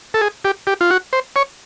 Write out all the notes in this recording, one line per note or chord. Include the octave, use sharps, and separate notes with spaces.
A4
G#4
G4
G4
F4
F#4
C5
C#5